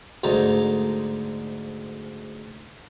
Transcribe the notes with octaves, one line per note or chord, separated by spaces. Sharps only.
D2 G#2 A4 A#5